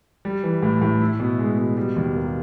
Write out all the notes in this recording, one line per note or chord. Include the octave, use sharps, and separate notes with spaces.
G3
E3
A2
A2
E4
B2
G#3
B2
G3
D#2
A#3